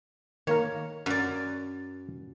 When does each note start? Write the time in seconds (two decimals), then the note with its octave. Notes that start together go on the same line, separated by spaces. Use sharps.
0.47 D#3 A#3 A#4 C#5
1.06 F#2 D5